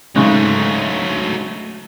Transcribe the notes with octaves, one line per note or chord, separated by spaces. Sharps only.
G#2 C#3 F#3 A3